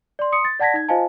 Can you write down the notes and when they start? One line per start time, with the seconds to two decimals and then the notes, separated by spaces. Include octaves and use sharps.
0.19 D5 C6
0.32 C6 D#6 C#7
0.45 A6
0.60 D5 F#5 A5 G#6 A#6 B6
0.74 D#4 G#6
0.88 F4 C5 D#5 F5 G#5 A5